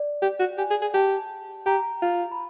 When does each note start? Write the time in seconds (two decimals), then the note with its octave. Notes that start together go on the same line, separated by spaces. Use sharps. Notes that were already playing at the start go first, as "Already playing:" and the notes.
Already playing: D5
0.22 G4
0.40 F#4
0.58 G4 G#5
0.70 G#4
0.82 G#4
0.94 G4 A5
1.66 G4 A#5
2.02 F4
2.32 B5